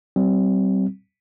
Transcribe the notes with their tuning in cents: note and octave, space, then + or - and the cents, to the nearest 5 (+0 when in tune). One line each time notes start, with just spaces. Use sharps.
G3 -35 C4 +0